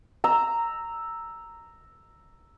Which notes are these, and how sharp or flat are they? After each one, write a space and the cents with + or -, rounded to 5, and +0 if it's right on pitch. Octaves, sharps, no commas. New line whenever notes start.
A#5 -10 E6 +0